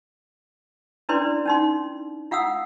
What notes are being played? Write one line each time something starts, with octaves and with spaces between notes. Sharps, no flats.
C#4 D4 E4 B4 D5 C6
C#4 D#4 C6
F4 F5 F#5 D#6 E6